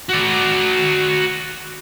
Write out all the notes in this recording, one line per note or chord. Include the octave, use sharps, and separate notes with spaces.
F#4 D5